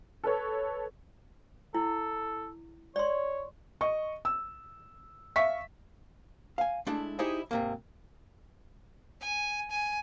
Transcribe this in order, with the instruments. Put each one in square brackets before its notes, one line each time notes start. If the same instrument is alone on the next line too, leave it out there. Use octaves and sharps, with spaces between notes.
[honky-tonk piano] A4 B4 C#5
[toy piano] E4 [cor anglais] A4
[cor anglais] C#5 [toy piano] D5 C6
[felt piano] D#5 C#6
E6
E5 F5 C#6 B6
[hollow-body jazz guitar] F5 G#5
G#3 A3 D4 E4
D#4 E4 G4 G#4 C5 D#5
G#2 C3 A#3
[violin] G#5
G#5